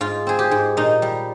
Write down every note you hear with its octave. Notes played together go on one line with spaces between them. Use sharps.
G#2 F4
C4 G#4
G4
G#2
A#2 D#4
G3